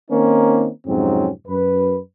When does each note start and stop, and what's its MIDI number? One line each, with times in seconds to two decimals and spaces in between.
0.11 0.68 51
0.11 0.68 58
0.11 0.68 60
0.11 0.68 61
0.11 0.68 63
0.11 0.68 70
0.86 1.29 41
0.86 1.29 44
0.86 1.29 48
0.86 1.29 54
0.86 1.29 60
0.86 1.29 61
1.47 1.98 42
1.47 1.98 71